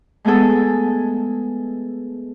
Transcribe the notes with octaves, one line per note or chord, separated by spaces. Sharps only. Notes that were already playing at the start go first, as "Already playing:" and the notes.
G#3 A3 B3 G#4 A4